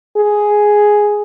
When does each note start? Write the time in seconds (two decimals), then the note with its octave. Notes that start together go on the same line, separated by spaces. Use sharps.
0.17 G#4